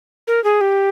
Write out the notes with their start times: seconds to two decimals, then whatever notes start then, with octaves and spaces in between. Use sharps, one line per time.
0.27 A#4
0.44 G#4
0.61 G4